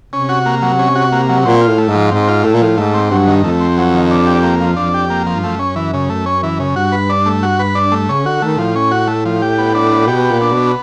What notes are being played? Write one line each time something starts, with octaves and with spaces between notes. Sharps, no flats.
C3 C#4
F#4
A#3
F#3
C#4
F#4
A#3
F#3
A#2 C4
F4
A2
A3
G#2
F3
G#2 C4
F4
A2 A3
A#2
A2 F3
G#2 A3
C4
G2 F#3
D#3
F2 A3
C4
F#3
D#3
D4
G4
A#3
F3
F2 D4
G4
A#3
F3
G2
F#2 A3
C#4
E3
C#3
A3
C#4
E3
C#3
G2 F#4
B4
D4
A3
F#4
B4
D4
A3
C#3 C#4
D3 F#4
D#3 A3
A2 F3
C#4
F#4
A3
F3
G4
B3
D4
B3
B2 G4
B3
A#2
D4
B2 B3